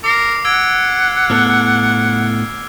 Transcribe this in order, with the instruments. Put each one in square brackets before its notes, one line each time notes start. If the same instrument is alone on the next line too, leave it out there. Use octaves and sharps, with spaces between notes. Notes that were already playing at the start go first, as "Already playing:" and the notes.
[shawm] A#4 [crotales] D6 C7
[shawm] F#5 [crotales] E6 G#6 D7
[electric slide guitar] A2 B3 A4 [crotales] F6